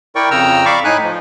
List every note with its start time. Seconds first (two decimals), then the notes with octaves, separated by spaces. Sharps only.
0.15 E4 A#4 D5 G5 C#6
0.31 F2 C#3 G5 A#5 E6 F6
0.65 D5 F5 B5 C#6 D6
0.84 A2 D#4 G#5 B5 F#6
1.04 F3